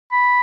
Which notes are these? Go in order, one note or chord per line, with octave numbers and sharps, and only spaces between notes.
B5